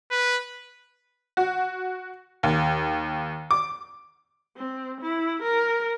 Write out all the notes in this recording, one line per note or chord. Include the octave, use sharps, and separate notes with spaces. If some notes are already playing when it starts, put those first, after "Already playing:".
B4
F#4
D#2
D6
C4
E4
A#4